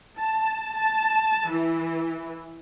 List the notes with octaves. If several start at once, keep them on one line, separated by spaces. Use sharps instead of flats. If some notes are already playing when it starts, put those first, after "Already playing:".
A5
A5
E3